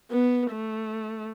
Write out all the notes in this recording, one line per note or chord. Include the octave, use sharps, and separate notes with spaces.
B3
A3